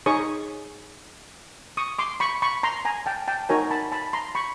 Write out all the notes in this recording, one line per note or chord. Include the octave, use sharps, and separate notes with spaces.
D#4 G#4 C#5 C#6 D#6
C#6 D#6
C6 D6
B5 C#6
B5 C#6
A#5 C6
G#5 A#5
G5 A5
G5 A5
D#4 F#4 A#4 C#5 G#5 A#5
A5 B5
A5 B5
A#5 C6
B5 C#6